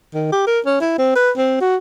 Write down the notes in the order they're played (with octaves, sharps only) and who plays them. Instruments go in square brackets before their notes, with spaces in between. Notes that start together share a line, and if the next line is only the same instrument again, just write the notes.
[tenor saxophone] D#3
G4
A#4
C#4
E4
C4
B4
C4
F#4